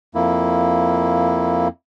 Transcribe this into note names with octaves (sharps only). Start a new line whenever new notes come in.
F2 A#3 E4